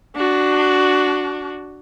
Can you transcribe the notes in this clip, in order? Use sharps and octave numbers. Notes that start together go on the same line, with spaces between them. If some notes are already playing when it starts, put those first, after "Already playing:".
D4 F#4